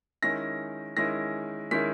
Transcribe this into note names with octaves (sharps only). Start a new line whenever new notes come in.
D#3 G#3 C#4 E4 A#6
D#3 G#3 C#4 E4 A#6
D#3 G#3 C#4 E4 B6